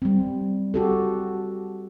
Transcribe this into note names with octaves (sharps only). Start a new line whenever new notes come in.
G3 C4
F#4 G4 A4